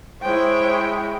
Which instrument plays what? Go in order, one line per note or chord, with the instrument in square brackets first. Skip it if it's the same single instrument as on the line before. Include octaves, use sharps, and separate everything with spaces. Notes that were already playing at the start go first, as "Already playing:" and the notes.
[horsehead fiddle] G#3 E4 [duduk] C5 [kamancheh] C#5 G5